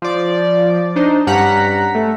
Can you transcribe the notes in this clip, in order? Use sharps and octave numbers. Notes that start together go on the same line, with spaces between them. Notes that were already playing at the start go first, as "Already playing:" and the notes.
F3 D5
D4 D#4 C5
G2 G3 C#4 F#5 A#5 B6
A3